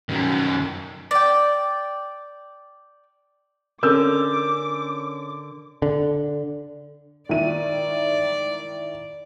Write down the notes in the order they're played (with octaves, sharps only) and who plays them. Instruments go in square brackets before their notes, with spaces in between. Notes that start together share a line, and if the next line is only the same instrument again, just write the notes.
[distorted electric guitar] F#2 D#3
[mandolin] D5 G5
[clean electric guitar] D3 [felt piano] C#4 E6 G6 [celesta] A4 A#4 [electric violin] D6
[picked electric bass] D3
[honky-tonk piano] D#3 E4 D#7 [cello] D5